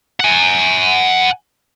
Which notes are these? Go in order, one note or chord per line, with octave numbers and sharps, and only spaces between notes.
F#5 G#5